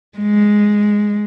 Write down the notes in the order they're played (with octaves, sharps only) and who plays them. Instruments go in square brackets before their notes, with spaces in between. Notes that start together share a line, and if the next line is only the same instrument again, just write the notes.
[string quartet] G#3